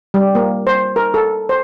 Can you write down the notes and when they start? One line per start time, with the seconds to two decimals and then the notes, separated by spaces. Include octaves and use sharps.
0.14 G3
0.35 A#3
0.67 C5
0.96 A#4
1.14 A4
1.49 C5